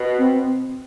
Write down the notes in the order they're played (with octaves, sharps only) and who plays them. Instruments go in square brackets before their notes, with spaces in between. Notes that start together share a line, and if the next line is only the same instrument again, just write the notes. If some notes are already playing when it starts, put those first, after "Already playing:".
Already playing: [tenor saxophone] B2
[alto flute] C4